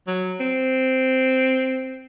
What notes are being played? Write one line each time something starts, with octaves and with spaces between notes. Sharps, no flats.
F#3
C4